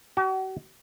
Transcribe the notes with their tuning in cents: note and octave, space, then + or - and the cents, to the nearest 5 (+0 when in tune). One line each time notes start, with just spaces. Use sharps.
F#4 +45 G#5 +30